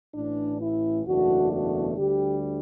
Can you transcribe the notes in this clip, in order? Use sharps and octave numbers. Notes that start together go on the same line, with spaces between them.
A1 A2 E3 D4
E4
F#1 E2 B2 A3 D4 F#4
F#4
D2 D3 G3 G4